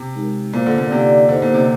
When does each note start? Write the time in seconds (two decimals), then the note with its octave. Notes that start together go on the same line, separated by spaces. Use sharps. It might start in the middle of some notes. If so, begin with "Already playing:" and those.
Already playing: C3
0.15 G#3 D#4 G4 A#4
0.53 A#2 F4 C5 F5
0.66 D3
0.78 A#2
0.91 C3 D#4 G4 D5 F5
1.29 D3 D#4 G4 C5 D#5
1.42 A#2
1.54 C3